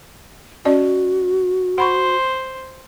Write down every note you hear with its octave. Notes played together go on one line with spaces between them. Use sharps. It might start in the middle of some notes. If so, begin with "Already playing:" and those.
C#4 F#4 D5 D#5
C5 F#5 B5 C#6